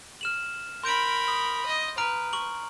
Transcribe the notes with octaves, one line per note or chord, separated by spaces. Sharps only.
F6 E7 F#7
A#4 B5 C6 G6 D7
D#6
D#5
B4 A#5 F6 D7
C#6 F#7